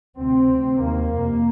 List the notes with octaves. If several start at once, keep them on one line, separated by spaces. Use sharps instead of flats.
D2 C3 C4
D2 C3
D#2 A#3
F2 C3